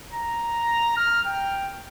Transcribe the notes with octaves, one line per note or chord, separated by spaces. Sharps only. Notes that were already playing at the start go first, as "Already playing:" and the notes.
A#5
F6
G5